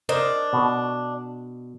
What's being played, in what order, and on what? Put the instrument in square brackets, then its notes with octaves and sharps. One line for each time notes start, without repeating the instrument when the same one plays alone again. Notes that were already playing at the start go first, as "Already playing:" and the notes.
[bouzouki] D4 [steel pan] A#4 C5 D#5
[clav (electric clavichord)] B2